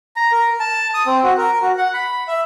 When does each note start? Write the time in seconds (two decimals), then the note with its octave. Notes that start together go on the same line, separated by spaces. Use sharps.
0.16 A#5
0.32 A#4
0.60 A5
0.94 D#6
1.06 C4
1.23 F#4
1.38 A#4
1.62 F#4
1.78 F#5
1.94 B5
2.28 E5